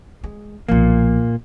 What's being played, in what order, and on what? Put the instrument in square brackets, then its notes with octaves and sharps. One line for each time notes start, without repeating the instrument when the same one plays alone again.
[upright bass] G#3
[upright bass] B1 F3 [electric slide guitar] A#2 A#3